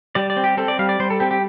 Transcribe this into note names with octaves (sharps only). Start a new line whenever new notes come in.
G3 D5
D5
C4
G4
C4 A4
D5
G3 F5
D5
G3 C5
A4
C4 G4
G4